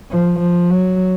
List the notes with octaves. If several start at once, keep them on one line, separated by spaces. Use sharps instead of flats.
F3
F3
F#3